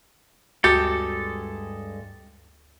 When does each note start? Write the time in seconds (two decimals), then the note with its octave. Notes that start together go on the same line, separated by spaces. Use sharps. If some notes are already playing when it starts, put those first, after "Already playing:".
0.64 D2 G2 G#3 F#4 G4 A4